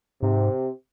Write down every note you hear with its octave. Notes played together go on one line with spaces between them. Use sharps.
G#2 C3